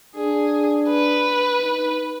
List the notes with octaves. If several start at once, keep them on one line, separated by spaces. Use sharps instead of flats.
D4 G#4
B4
D#4